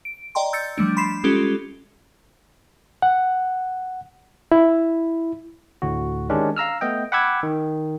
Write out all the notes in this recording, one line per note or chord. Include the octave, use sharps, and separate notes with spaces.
D7
D5 D#5 G5 A#5 C6
E6 G6 A6 C#7
F3 G3 A3 D4
B5 C6 B6 C7 E7
G3 G#3 C#4 F4 G4 A4
F#5
E4
D2 A2 D3 F#4
D#3 G#3 C#4 D4 G4
F5 A#5 E6 F6
A3 B3 D#5 G5
F#5 G5 B5 D6 E6 G#6
D#3